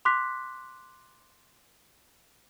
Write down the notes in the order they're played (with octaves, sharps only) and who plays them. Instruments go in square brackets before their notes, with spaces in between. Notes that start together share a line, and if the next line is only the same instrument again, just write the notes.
[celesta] C6 D6 F#6 B6